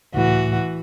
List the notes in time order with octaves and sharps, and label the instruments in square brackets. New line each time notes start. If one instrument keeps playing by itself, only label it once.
[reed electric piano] C#2 A2 [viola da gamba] E3 F#4